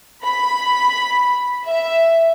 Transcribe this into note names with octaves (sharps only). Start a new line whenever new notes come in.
B5
E5